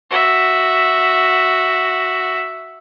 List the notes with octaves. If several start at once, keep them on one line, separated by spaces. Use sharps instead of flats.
F#4 E5